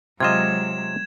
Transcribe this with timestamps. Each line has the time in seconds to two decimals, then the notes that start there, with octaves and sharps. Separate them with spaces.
0.20 C3 F#3 G#3 F4 D#5 G#6 E7